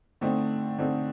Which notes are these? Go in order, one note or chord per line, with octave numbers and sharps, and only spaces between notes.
D3 A3 C4 D#4
D3 A3 C4 D#4